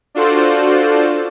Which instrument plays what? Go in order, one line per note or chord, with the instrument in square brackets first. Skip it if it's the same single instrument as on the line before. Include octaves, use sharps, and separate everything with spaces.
[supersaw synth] D4 F4 F#4 A4 C5 D5